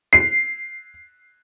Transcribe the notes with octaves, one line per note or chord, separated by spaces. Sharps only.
C7